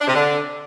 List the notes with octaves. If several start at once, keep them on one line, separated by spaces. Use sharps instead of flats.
D4
C3
D3